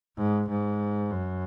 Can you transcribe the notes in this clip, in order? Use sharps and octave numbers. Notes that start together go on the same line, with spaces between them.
G#2
G#2
F#2